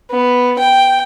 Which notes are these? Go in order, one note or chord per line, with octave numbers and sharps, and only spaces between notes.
B3
G5